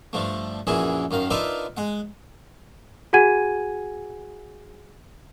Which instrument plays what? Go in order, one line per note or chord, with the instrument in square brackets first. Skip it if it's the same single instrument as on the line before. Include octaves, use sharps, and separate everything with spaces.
[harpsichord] G2 F3 A3
A#1 F#2 E3 E4 G#4
F#2 D#3 F5
D4 D#4 F4 A#4 B4 E5
G#3 F#5
[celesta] F#4 G#4 F#5 G#5 G#6 D#7